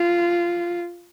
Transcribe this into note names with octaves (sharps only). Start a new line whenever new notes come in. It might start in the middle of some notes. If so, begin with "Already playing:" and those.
Already playing: F4